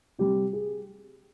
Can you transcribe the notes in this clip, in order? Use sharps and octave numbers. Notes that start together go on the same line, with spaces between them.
C3 G3 C4 G4
G#4